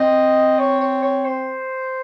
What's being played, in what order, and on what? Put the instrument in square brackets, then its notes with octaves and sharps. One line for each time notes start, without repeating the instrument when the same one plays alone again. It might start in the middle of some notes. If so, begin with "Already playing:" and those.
Already playing: [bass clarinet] C4 [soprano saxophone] D#5
[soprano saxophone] C#5
C#5
C#5
C5